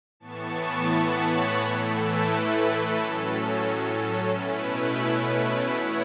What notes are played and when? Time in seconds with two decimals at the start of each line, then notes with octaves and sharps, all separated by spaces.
0.20 A2 E3 B3 A5 C#6
0.89 F#5 B5
1.24 C#5 F#5
1.57 A2 E3 A3 E4 A4 C#5
1.93 B4
2.27 A4
2.61 B4
2.96 A2 F#3 C#4 A4
4.33 B2 A3 C#4 E4 B4
5.71 E3 B3 E4 C#5 F#5